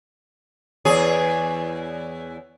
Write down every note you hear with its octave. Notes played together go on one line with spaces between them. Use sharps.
E2 G#4 C#5 D5